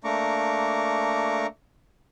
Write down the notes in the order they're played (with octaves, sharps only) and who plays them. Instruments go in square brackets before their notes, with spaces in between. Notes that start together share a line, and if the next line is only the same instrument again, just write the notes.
[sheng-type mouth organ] A3 A#3 D4 A#5 C#6 D6